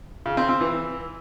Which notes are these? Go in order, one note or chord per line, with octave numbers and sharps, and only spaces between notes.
C#3
C4
C4
E3